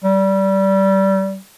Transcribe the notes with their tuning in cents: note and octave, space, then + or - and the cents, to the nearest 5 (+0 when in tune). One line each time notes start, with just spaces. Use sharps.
G3 -20